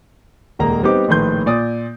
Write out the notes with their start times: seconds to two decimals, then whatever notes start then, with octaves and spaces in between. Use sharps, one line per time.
0.59 D#1 C#2 A#3 A#5
0.83 G3 B3 C4 D#4 G4 D6
1.08 A#1 A2 D#3 B4 C6 G6
1.46 A#2 D5 D#6